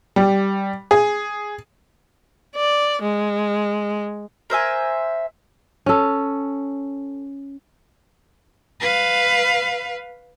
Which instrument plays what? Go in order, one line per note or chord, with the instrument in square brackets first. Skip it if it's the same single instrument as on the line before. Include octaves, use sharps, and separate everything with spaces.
[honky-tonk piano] G3
G#4
[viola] D5
G#3
[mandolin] A#4 C5 E5 G#5
[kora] C#4 A4
[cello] B4 F5